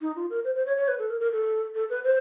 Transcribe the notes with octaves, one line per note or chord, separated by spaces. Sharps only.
D#4
F4
A#4
C5
C5
C#5
C#5
B4
A4
A#4
A#4
A4
A4
B4
C5